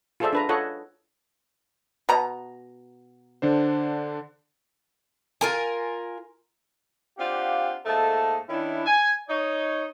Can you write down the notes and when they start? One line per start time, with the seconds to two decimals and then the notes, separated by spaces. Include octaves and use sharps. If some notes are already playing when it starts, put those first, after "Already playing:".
0.20 F4 G#4 A4 C5 D5 E5
0.33 D4 B4 A#5
0.49 F4 A4 C#5 D#5 F#5
2.09 B2 A#5
3.42 D3 D4 C5
5.41 F4 A#4 G#5
7.18 C4 D4 F4 G4 F5 F#5
7.86 G#2 A3 A#3 A4 D#5 A5
8.49 D#3 C#4 D4 E4
8.86 G#5
9.29 D#4 C#5